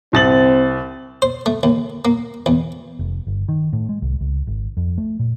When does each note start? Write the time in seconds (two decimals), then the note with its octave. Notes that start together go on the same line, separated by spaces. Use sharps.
0.13 C2 C4 A6 F#7
1.22 C5
1.46 A3
1.63 D#2
2.05 A#3
2.46 E2
2.99 F1
3.27 G1
3.49 D#3
3.73 A2
3.89 G#3
4.02 C2
4.21 C#2
4.47 G#1
4.77 F2
4.98 A3
5.19 A#2